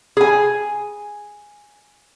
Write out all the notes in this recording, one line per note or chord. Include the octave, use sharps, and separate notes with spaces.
G#4 G#5